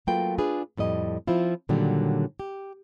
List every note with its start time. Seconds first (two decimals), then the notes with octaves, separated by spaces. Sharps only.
0.07 F#3 A3 A#3 F4 B4 G5
0.38 D4 F4 G#4 B4
0.77 F2 A2 G3 D#5
1.27 F3 C4 E4 F4
1.69 A#2 D3 D#3 F#3 G3
2.40 G4